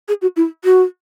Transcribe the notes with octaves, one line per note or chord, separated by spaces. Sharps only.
G#4
F#4
E4
F#4